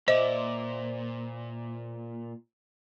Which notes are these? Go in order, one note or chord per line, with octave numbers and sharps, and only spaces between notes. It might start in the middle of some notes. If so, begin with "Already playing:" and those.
A#2 E4 C5 D5 D#5